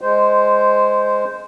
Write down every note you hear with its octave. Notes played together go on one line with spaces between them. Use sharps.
G#3 C5